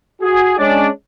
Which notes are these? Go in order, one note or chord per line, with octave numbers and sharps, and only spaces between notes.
F#4 G#4
G#3 C#4 D4 D5